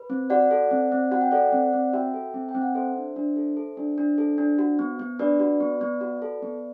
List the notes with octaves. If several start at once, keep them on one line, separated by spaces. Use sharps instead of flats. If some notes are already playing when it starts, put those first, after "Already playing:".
Already playing: B4
C4
F#4 D5 F#5
A4
C4
C4
F#4 F#5
G5
A4 D5 F#5
C4
C4
F#4 E5 G5
A4
C4
G5
C4
F#5
A4 C5 E5
D4
D4
A4
A4
D4
D4
A4
D4
F#4
B3
B3
D4 B4 D5
F#4
B3
B3
F#4
A4
B3